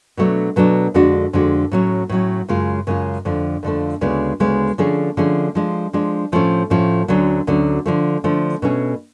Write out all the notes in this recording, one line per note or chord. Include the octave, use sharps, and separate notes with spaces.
B2 F#3 A3 D4
B2 F#3 A3 D4
F2 D3 G#3 D4 F#4
F2 D3 G#3 D4 F#4
A2 F#3 C#4
A2 F#3 C#4
F#2 C#3 G#3 C#4 F4
F#2 C#3 G#3 C#4 F4
F2 D3 F3 A3
F2 D3 F3 A3
D2 C#3 G#3 B3 D4
D2 C#3 G#3 B3 D4
D3 F3 A3 C#4 G#4
D3 F3 A3 C#4 G#4
F3 G#3 D4
F3 G#3 D4
A2 F3 A3 C#4
A2 F3 A3 C#4
D2 D3 F#3 C#4
D2 D3 F#3 C#4
D3 F3 A3
D3 F3 A3
B2 A3 C#4 F4 G#4